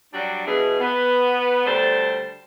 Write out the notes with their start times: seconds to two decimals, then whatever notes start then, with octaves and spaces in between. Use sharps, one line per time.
0.13 F#3 G3 D4
0.46 B2 E3 E4 G#4
0.79 B3
1.66 D2 G3 A4 C5